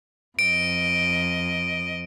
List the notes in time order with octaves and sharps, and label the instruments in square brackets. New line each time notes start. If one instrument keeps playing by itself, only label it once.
[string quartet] F2 D#5 [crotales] D7